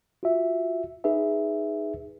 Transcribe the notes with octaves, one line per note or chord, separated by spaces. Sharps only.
F4 F#4 E5
D#4 G#4 B4 E5